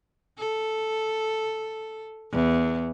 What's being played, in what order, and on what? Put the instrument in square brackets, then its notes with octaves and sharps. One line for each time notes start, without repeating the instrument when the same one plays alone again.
[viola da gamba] A4
E2